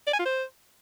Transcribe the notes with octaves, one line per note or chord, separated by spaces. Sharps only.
D5
G#5
F4
C5